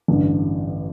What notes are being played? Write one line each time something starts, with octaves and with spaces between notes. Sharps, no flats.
A1 G2 D3